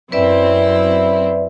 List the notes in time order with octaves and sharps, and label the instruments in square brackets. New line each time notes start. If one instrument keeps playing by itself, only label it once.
[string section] F#2 C4 E4 [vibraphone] B4 D5 E5